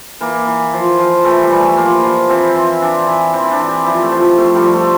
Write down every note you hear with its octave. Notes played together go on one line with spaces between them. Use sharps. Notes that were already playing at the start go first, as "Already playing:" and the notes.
E3 A#3
E3
F3
F3
E3 A3
G3
E3
A3
F3 A#3
F3
E3 C4
E3
E3 D4
E3
E3 C4
E4
D4
E3
G4
F3 E4
A3
F3
F3 A3
G3
F3
A3